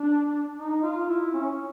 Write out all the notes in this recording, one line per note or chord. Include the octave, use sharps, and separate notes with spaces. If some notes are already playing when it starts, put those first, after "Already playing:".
Already playing: D4
D#4
F4
E4
C#4